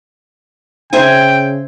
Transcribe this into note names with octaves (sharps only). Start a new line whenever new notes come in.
C#3 C5 E5 G5 G#5